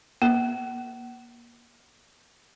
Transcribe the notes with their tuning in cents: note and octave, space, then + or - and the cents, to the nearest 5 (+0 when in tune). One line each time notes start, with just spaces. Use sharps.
A#3 +30